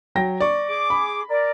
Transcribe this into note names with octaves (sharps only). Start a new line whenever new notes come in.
F#3 G5 A#6
D5 C#6
G#4 D6
B5
A#4 D5